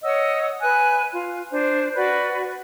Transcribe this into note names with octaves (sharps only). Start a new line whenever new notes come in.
C#5 D#5 F#5 E6
B4 G#5 F#6
F4
D4 C5
F#4 B4 D5